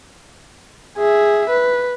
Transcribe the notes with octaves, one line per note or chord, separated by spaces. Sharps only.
G#4 E5
B4